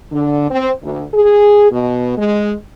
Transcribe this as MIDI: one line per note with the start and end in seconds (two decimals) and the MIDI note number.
0.12 0.50 50
0.51 0.71 60
0.82 1.03 38
1.15 1.70 68
1.71 2.14 47
2.17 2.53 56